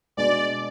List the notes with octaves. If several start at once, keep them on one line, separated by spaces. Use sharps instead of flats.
B2 G#3 D4 D5